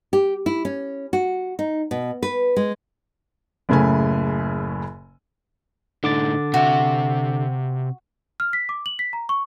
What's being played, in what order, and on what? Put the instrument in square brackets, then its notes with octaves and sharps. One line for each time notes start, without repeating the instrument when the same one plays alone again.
[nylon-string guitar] G4
E4
C#4
F#4
D#4
B2
B4
G#3
[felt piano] F#1 A2 C#3 A3 G#5
[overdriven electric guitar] A2 D#4 [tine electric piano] D3 D6 A6
[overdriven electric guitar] C3 E5 [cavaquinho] F#4
[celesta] F6
B6
D6
F#7
B6
A#5
C#6